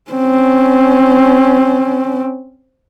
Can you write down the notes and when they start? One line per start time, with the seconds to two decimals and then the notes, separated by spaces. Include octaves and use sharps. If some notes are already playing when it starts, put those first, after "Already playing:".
0.12 C4 C#4